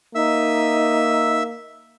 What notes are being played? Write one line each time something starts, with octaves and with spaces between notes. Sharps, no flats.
A#3 D#4 E5 E6